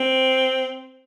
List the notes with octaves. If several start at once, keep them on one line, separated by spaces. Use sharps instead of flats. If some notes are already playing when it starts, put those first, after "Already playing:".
Already playing: C4